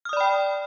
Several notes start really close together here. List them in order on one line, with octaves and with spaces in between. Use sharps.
F6 D#6 D5 B5 G5